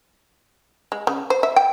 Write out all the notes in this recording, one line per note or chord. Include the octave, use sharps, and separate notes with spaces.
G#3
C#3
C5
E5
G5